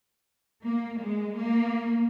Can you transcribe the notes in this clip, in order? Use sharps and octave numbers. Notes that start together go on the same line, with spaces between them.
A#3
G#3
A#3